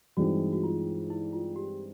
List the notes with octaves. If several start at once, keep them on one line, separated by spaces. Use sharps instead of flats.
G2 E3 G#3 C4 D#4 F#4
F#4
F4
E4
F4
G4